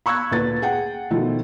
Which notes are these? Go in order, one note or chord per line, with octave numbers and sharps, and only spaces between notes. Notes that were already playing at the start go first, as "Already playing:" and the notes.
B5 C#6 E6 F#6 G#6
D2 A#2 B4 A6
G#4 F#5 G5
B2 D#3 F3 A3